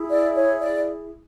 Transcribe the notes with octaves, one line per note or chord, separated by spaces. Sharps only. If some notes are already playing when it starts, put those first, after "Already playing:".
Already playing: E4 G#4
D5
C#5
D5